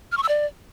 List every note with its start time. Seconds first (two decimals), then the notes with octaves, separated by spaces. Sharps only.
0.12 F6
0.17 C#6
0.23 E6
0.29 D5